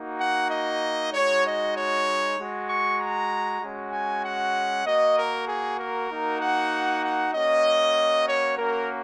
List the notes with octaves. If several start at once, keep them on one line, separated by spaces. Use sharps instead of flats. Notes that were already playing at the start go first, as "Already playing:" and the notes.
Already playing: A#3 D#4 F#4
F#5
D#5
G#3 D#4 F#4 C#5
D#5
C#5
G#3 F#4
C#6
A#5
G#3 C#4 F#4
G#5
F#5
A#3 F#4 D#5
A#4
G#4
A#4
A#3 D#4 F#4
F#5
F#5
A#3 C#4 F#4 D#5
C#5
A#3 C#4 F#4 A#4